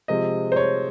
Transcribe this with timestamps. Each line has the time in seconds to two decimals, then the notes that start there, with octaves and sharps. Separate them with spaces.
0.08 C3 F3 G#3 D#5
0.52 C5
0.56 C#5